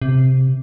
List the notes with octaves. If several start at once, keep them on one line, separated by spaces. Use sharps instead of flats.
C3